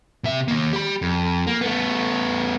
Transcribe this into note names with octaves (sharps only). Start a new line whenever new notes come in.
C3 E5
D#3 A#3
G4 B5
F2
A#3
A3 B3